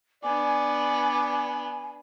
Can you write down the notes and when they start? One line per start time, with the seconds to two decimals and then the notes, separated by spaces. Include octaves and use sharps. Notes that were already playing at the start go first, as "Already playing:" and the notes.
0.24 B3 D4 D5 G#5